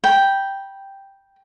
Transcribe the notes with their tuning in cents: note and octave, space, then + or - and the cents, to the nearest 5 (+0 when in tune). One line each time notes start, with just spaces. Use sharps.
G5 +0 B5 -30